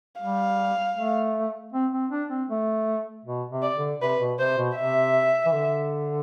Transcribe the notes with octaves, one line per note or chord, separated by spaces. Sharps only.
G3 F5
A3
C4
C4
D4
C4
A3
B2
C3
D5
D3
C3 B4
B2
C3 C5
B2
C3 E5
E3
D3